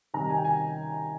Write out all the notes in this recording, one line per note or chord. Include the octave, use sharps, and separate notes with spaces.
C3 D#3 G3 A#5
G#5
G5
G#5